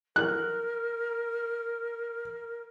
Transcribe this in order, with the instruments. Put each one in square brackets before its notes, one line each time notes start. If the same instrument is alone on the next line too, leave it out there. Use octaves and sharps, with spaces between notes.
[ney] A#4 [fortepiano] F#6